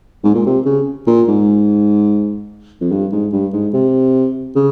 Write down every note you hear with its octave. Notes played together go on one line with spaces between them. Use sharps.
G#2
A#2
C3
C#3
A#2
G#2
F2
G2
G#2
G2
G#2
C3
C#3